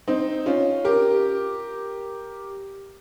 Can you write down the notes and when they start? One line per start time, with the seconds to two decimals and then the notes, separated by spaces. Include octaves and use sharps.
0.08 C4 D#4
0.46 C#4 F4
0.85 G4 A#4